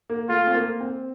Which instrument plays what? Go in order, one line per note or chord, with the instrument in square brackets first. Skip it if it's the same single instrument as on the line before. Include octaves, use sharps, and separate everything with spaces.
[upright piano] A#3
[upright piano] A3 [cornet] F4
[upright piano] C4
A#3
C4